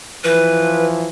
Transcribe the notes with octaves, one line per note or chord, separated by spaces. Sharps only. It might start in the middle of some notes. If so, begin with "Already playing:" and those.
E3 F3 B4